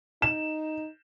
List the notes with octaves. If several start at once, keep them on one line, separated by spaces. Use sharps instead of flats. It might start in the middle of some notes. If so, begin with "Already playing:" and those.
D#4 E7